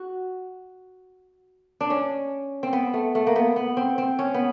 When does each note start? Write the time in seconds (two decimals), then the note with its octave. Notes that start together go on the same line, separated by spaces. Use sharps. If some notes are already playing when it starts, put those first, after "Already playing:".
Already playing: F#4
1.81 D4
1.90 C#4
2.63 C4
2.73 B3
2.94 A3
3.15 A3
3.27 A#3
3.36 B3
3.56 B3
3.77 C4
3.98 C4
4.19 C#4
4.34 B3